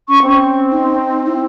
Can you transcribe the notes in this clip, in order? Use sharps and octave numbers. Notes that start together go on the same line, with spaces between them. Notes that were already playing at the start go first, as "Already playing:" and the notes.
C#4 C#6
C4 C#4
D#4
E4